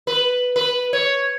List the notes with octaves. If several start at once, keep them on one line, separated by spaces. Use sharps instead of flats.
B4
B4
C#5